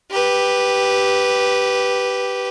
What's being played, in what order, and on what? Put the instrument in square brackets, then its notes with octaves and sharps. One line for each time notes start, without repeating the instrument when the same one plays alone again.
[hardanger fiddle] G4 B4